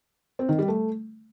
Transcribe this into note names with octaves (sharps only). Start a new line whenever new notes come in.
C4
D#3
G3
A3